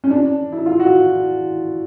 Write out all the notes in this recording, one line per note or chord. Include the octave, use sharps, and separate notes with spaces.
C#4
D4
E4
F4
F#4